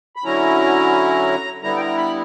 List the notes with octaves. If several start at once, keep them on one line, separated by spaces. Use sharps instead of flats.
B5
D3 F#3 C#4 E4 A#5
D3 G3 B3 E4 A#5
G5
A#5
B5